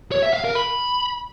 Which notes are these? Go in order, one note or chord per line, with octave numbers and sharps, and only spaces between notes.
C#5
E5
F5
A#4
B5